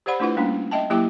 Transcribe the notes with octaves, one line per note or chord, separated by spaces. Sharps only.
G4 C5 D5 F#5 B5
A3 D4 E4 F4 B4 F#5
G3 A#3 C#4 D4
D#5 E5 G5 A5
F#3 A#3 E4 G4 E5 D6